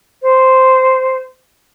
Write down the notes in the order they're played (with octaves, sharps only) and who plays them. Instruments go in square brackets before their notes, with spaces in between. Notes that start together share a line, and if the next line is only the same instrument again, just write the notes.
[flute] C5